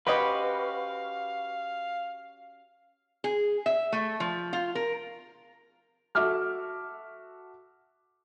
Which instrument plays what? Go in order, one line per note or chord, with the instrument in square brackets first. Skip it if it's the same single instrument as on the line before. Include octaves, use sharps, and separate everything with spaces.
[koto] C#4 F#4 G4 [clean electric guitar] B4 [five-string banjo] C5 D#5 [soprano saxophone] F5
[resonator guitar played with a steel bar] G#4
E5
A3
F3
F4
A#4
[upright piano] F#4 A4 E5 D6 F6